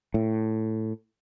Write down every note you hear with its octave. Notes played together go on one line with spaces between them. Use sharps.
A2